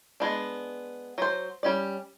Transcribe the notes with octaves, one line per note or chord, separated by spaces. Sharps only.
G#3 B3 D4
F#3 C5
G3 C#4 D5